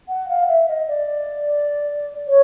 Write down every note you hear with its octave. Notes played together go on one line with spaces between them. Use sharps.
F#5
F5
E5
D#5
D5
C#5